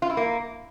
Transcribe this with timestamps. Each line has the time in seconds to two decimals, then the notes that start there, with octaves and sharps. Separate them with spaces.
0.02 F4
0.10 E4
0.17 A#3